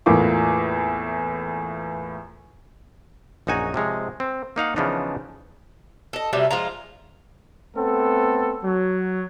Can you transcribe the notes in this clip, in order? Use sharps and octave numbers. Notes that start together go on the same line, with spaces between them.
E2 A2 A#3 F4 D6
A#1 F#2 D#4 F#4 G#5 A#5
C3 F3 G#3 C#5
C4
A#3 D#4 F5 F#5
C#3 E3 F3 B3 D4 D#4
A4 D#5
C3 F#3 G3 A3
F3 G#3 F4 A#5
A3 B3 C4 A4
F#3